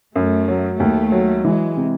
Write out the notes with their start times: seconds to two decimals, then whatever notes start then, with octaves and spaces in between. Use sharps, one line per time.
0.15 F#2 A3
0.48 F#3
0.80 D#2 A3
1.12 F#3
1.44 E3 G#3
1.77 C3